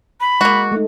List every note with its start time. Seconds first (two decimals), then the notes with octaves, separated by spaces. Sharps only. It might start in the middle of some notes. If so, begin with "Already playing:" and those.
0.21 B5
0.41 G#3 A#3 F#4
0.72 A3 D#4